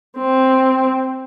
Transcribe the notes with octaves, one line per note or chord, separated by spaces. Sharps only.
C4